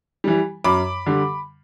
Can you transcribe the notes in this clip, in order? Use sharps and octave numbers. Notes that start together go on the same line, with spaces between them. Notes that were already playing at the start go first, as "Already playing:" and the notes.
E3 G3
F#2 B5 D6
D3 G3